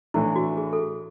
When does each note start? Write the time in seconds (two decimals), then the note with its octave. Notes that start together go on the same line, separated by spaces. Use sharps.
0.14 A2 E3 A3 D4 E4
0.36 F#4
0.57 G#4
0.73 A4
0.79 G#4